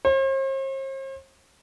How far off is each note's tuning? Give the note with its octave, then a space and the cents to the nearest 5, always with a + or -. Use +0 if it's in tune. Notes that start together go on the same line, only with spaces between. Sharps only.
C5 +45